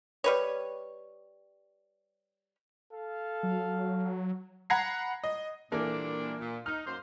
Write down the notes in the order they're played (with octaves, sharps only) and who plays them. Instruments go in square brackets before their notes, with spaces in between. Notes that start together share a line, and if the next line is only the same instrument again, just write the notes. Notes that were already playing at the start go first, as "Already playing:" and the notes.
[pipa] G3 B4 C#5
[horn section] A4 F5
[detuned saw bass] F#3
[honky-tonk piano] F#5 A#5 B5 G#6 A#6 C7
D#5
[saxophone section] A#2 G3 D4 [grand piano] E3 A#3 A4
[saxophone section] A#2
[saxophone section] D#4 [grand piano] F6
[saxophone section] F#2 A#3 C5